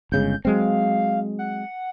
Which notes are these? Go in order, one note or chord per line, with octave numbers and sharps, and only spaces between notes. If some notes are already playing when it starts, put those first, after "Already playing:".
G1 C#3 G#3 G6
F#3 G#3 C4 F5
F#5